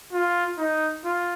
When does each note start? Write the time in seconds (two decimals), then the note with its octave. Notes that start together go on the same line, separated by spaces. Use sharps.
0.12 F4
0.58 D#4
1.04 F4